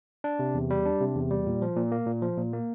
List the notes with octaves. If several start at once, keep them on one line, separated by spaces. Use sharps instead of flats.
D4
C3
E2
G3
D4
C3
E2
G3
A#2
F3
A#2
A#3
A#2
F3
A#2
A#3